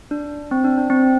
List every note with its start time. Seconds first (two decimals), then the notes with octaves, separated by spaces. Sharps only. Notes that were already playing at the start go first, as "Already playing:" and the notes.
0.11 D4
0.51 C4
0.64 D4
0.78 D4
0.90 C4